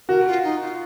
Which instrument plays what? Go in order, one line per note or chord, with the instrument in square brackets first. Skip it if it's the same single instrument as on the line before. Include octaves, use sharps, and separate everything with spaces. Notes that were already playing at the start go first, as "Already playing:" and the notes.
[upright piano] F#4 [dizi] A#4
[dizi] F4
D#4
F4